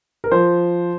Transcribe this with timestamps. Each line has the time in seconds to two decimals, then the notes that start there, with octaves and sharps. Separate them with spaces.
0.24 A#4
0.31 F3 C5